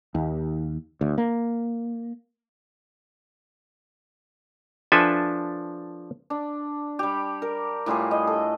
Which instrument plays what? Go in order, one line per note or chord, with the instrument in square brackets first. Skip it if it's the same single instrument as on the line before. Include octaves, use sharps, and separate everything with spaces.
[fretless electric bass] D#2
D2
A#3
[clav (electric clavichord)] F3 D4 A4 B4 E5 G#5
[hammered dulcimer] D4
G3 G4
A#4
A2 G3 F4 G#4
D#5
A4